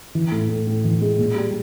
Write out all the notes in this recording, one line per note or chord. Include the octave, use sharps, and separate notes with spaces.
E3
A2
A2
A2
E3
G#3
A#2
G3